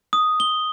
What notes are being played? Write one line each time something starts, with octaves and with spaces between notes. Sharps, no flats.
D#6
G7